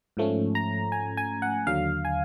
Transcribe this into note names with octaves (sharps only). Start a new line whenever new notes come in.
G#2 F3 A3 C#4
A#5
G#5
G#5
F#5
D#2 D3 F#3 F5
G#5